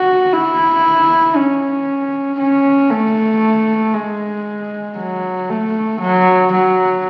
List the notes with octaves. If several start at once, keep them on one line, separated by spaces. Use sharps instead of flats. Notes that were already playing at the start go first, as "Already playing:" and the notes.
Already playing: F#4
E4
C#4
C#4
A3
G#3
F#3
A3
F#3
F#3